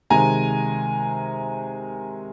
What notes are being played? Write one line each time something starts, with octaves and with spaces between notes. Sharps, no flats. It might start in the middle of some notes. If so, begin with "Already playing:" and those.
C3 D#3 G#3 G#5 A#5